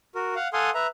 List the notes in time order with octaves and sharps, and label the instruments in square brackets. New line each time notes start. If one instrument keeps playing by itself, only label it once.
[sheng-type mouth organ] F#4 A#4
F5 F#5
A4 F5 F#5 G#5 C6 D#6
B4 E5 A#5